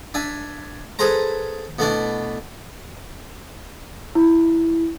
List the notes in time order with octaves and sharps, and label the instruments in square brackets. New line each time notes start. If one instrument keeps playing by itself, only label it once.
[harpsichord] D4 E5 G#5
G#4 A4 B4 C5 A#5
B2 A3 D4 E4
[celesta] E4